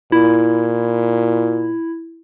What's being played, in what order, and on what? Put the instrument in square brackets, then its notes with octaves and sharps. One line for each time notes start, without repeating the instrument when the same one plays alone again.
[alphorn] A#2 [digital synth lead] E4